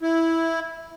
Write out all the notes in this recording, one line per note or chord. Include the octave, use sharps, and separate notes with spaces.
E4